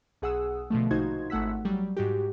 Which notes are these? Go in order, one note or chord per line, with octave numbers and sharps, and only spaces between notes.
B1 G#4 F#5 D#6 E6
B2 D3 F3 A3
A#1 D#4 F4 F#4 C5 G#6
G#1 A3 F#5 E6 B6
F#3 G3
G#2 F#4 G4